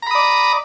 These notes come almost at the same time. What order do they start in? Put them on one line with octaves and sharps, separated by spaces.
A#5 B5 D#6 D5